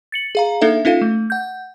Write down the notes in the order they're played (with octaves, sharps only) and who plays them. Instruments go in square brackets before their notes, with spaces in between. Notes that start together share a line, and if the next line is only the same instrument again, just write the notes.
[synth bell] A6 C#7 F#7
G#4 F5 A#5
A#3 D4 D#4 A4 E5
C#4 D#4 F4 A4 F5
A3
F#5 G6